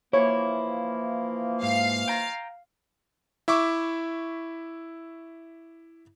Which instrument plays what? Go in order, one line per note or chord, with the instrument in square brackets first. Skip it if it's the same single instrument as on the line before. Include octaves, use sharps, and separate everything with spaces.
[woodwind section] E3 F3 A#3 [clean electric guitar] E4 [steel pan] C#5
[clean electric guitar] G#2 [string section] F5
[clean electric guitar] G5 A#5
[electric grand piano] E4 E5 C#6 D6